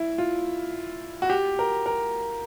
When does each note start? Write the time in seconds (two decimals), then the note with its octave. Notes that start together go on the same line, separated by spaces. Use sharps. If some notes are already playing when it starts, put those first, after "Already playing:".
Already playing: E4
0.18 F4
1.22 F#4
1.30 G4
1.59 A#4
1.86 A#4